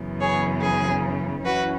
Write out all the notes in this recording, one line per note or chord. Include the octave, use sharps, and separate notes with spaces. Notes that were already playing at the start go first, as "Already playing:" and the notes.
Already playing: F#2 C#3 E3 B3
G#4 C#5
G#4
F#2 E3 C#4 E4 F#4 B4